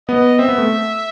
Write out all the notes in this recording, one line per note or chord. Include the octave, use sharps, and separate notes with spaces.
B3 D#5
C4 E5
B3
A3